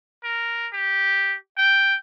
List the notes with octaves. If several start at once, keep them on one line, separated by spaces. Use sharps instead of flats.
A#4
G4
G5